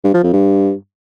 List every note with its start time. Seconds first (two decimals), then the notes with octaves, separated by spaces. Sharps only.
0.04 G2
0.14 F3
0.23 F2
0.33 G2